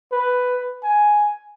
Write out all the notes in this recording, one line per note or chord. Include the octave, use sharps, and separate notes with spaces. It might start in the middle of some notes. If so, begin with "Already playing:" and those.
B4
G#5